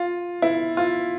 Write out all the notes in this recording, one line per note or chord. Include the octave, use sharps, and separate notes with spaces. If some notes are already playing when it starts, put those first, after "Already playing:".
Already playing: F4
E4
F4